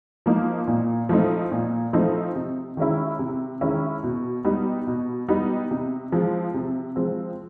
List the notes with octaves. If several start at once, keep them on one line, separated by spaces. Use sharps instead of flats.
F3 A#3 D#4
A#2
F3 A3 C4 D#4
A#2
F3 A3 C4 D#4
C3
D#3 G#3 C#4 E4
C3
D#3 G#3 C#4 E4
B2
G3 B3 D#4
B2
G3 B3 D#4
C3
F3 G#3 C4
C3
F3 G#3 C4